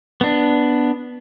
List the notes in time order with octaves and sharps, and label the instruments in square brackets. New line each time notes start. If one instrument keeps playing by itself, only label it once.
[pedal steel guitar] B3 D4